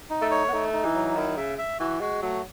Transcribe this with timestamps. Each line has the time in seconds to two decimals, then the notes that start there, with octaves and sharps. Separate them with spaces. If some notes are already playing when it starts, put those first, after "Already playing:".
0.10 D#4
0.21 A3
0.31 C#5
0.48 B3
0.53 A3 D#4
0.73 D#4
0.85 E3
0.94 F#3
1.16 D#3 E4
1.37 C#3 E5
1.58 E5
1.80 E3 F#4
2.01 G#3 F#4
2.22 F#3 A3